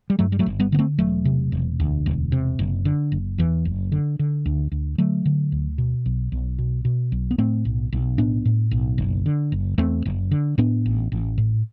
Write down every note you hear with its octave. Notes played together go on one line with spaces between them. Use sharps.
G3
G2 F#3 A3
G3
F#3 A3
G1
G3 B3
D3 B3
A3 C4
E1 F#3 A3
C3
E1
D2
E1
C3
F#1
D3
F#1
E2 E3
F#1
D3
D3
D2
D2
D3 F#3 A3
D3
D2
B2
B1
B1
B2
B2
B1
B3
A2 A3 C4
B1
B1
A2 B3 D4
A2
B1
F#1
D3
F#1
E2 A3 C4
F#1
D3
A2 B3 D4
A1
A1
A2